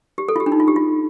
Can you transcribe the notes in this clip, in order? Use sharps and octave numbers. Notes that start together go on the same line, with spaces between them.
G4
A4
F4
G4
D4
D#4
F4
G4
F4